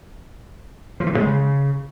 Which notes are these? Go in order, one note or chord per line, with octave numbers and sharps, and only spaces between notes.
F3
E3
G2
G#3
C#3